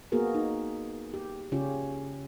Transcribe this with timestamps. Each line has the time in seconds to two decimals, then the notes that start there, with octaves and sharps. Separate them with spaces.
0.12 A#3 B3 F#4 G#4 A#4
0.35 D#4
1.14 G4
1.52 C#3 C#4 F4 G4